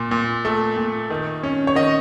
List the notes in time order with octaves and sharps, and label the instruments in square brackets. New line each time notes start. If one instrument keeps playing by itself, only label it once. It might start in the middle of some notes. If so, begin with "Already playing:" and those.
Already playing: [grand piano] A#2
A#2
A3
A#2
D#3
C#4
C#5
D#3 D#5